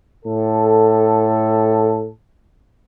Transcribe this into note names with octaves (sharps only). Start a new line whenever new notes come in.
A2 A4